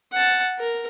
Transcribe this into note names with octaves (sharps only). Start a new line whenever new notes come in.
F#5 A5
A#4